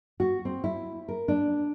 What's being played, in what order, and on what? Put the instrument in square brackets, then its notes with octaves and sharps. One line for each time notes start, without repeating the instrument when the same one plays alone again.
[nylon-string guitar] F#4
C4
E4
A#4
D4